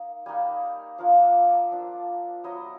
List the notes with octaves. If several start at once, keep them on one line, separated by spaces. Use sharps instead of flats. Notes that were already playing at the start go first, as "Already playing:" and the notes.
Already playing: A#3 D#4
G3 A#3 D#4 G#5
F3 A#3 D4 F4 F5
E5
D5
F3 A#3 D4 F4
F#3 B3 E4 D#5